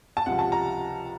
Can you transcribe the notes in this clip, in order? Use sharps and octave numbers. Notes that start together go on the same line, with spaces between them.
A5
C#2 C3 F3 F#5
A5
A#5